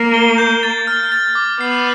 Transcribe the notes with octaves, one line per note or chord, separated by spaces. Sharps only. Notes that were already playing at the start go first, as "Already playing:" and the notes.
Already playing: A#3
G7
G6
A6
F6
A6
D6
B3 C7